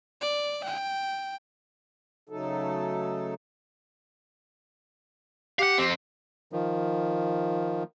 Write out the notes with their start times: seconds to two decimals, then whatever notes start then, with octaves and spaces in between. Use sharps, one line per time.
0.21 D5
0.64 G5
2.29 C#3 F#3 A3 D#4 A4
5.59 G4 F5 F#5
5.78 F2 C4
6.52 D#3 F3